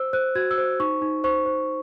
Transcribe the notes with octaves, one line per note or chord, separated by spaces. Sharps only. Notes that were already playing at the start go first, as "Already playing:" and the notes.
Already playing: C5 E6
C5 F#6
F#4 G#6
E6
C5
D#4 C#6
D#4
C5 C#6
C5